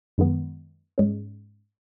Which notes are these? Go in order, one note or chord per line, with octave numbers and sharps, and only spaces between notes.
F#2 D#3 G#3 B3
G#2 G#3 C#4